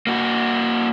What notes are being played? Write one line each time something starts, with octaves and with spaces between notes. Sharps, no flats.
A#3 F#4